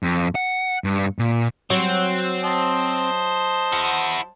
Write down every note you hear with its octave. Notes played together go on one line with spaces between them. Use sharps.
F2
F#5
G2
A#2
F#3 C4
C5 D#5 A5
E4 F#5